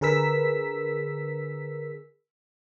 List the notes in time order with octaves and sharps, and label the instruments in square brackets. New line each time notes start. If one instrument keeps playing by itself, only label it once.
[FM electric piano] D3 G#4 A#4 B4 E6 B6